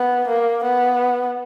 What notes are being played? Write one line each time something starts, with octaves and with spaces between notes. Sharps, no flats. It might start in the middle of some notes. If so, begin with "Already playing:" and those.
Already playing: B3
A#3
B3